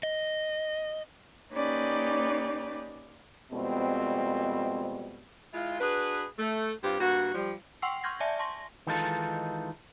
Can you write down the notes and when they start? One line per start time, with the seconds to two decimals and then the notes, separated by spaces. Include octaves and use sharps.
0.03 D#5
1.53 A#3 C#4 D#4 G4 B4 D5
3.52 F2 B2 G3 G#3 C4
5.54 G#3 E4 F4
5.80 D4 F#4 G#4 B4
6.39 A3
6.84 G2 C4 F4 G4
7.01 G2 A#3 F#4
7.34 F3 G3
7.82 F#5 G5 C6 C#6 E6 C7
8.03 C6 C#6 F6 G6 G#6 A#6
8.20 D5 E5 G#5 A5 A#6
8.39 A5 C6 C#6 A#6
8.87 D#3 E3 G#3 D#4 F4 A4